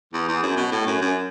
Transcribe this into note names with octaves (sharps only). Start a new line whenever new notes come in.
E2
E2
F#2
B2
A2
F#2
F#2